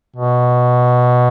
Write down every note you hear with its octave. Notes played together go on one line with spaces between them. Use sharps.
B2